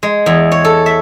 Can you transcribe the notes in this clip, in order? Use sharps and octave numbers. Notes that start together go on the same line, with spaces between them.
G#3
E2
C#5
A4
E5